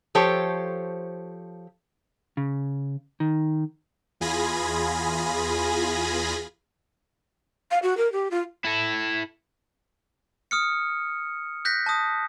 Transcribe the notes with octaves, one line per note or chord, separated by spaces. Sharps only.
F3 G4 A4 C5 C#5
C#3
D#3
E2 F4 G#4 G#5 B5 A#6
F5
F#4
A#4
G4
F4
E4 A4
D#6 F6 C#7
F#6 G6 A#6 B6
A5 D#6